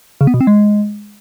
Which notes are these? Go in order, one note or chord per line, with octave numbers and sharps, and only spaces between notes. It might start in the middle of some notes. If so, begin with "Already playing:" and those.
C#3
B3
B2
C4
G#3